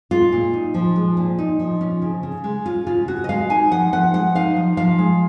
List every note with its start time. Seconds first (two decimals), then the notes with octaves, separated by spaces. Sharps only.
0.11 G#3 F4
0.32 A#2
0.54 D#4
0.74 F3
0.96 G#3
1.17 A#2
1.38 D#4
1.60 F3
1.81 C#4
2.02 C#3
2.23 C#3
2.44 G#3
2.66 C#4 F4
2.87 C#3 F4
3.08 C#3 F#4
3.24 D#5
3.29 G#3 F5
3.50 D#4 G#5
3.71 F3 F#5
3.92 F3 F#5
4.13 G#3 F#5
4.35 D#4 F5
4.56 F3
4.77 F3 F5
4.99 G#3